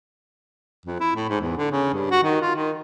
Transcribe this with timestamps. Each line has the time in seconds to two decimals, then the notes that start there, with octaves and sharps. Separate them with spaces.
0.86 F2
1.00 E4
1.16 A2
1.29 G#2
1.41 E2
1.58 D3
1.72 C#3
1.94 G2
2.11 F#4
2.24 D#3
2.41 F4
2.56 D#3